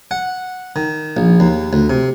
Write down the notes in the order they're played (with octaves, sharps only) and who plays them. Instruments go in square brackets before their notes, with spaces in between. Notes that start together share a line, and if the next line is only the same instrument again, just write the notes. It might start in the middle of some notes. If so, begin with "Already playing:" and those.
[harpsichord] F#5
D#3
A#1
D#2
D2
C3